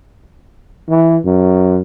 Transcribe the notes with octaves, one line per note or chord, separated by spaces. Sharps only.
E3
F#2